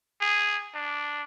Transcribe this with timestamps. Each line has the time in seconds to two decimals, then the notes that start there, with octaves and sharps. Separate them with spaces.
0.21 G#4
0.75 D4